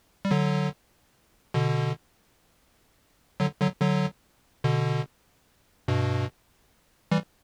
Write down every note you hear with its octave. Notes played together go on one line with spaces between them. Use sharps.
G3
D3 F#3
B2 D3
D3 F#3
D3 F#3
D3 F#3
B2 D3
G2 B2
E3 G3